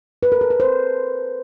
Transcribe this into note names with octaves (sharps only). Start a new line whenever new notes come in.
B4
A#4
A4
B4
C5